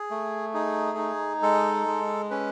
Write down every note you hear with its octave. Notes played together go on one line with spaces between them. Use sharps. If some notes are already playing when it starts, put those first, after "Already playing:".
Already playing: G#4
A3
D#4 G#4
D#4
G#3 A4
G#3
C#4 B4